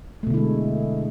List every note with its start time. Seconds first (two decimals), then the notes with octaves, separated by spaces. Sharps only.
0.23 A3
0.27 B2
0.30 D3
0.34 E4
0.37 G#3